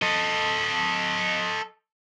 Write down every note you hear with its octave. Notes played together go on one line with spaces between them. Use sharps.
A4 D#5